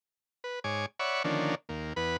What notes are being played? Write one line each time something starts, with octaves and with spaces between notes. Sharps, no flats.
B4
G#2 C#5 G#5 D6
C#5 D5 E5 F#5 B5 C#6
D3 D#3 F3 A#3 C#4 D4
D#2 A#3
E2 B3 B4 B5